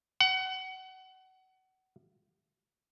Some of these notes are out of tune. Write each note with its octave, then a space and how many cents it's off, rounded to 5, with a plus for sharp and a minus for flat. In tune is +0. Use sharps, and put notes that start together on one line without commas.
F#5 +25